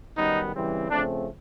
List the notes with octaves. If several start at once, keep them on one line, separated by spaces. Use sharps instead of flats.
F#2 D#3 G3 B3 D#4
C#3 E3 G3 C4
C#3 F3 A3 C4 D4